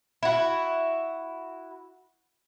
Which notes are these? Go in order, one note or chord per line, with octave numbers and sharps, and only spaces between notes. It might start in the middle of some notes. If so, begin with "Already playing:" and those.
E4 F#4